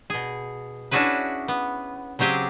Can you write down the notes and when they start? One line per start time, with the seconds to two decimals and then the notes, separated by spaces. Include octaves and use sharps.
0.10 B2 G#4
0.91 C#4 D4 E4 F#4 G#4 B4
1.48 B3
2.19 C#3 F#3 C4 G4 G#4